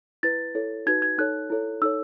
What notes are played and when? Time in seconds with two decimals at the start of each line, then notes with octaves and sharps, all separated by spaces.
0.23 E4 B4 A6
0.55 E4 A4 C#5
0.86 D#4 F#4 B4 G#6
1.02 G#6
1.18 D#4 A4 C#5 F#6
1.50 E4 A4 C#5
1.81 D#4 A4 C#5 E6